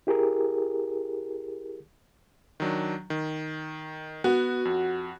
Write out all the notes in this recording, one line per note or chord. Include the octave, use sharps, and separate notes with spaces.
E4 G4 G#4 A#4
D#3 F#3 D4
D#3
B3 F#4
F2